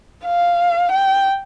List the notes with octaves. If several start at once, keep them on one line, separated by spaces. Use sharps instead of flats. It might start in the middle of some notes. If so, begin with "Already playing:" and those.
F5
G5